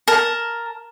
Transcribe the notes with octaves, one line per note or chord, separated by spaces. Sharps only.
A#4 A5